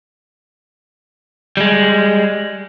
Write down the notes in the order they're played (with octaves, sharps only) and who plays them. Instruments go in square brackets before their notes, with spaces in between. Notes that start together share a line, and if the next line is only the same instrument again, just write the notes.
[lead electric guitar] G3 G#3